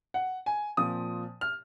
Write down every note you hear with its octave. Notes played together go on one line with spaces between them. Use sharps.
F#5
G#5
A#2 F3 C4 D#6
F6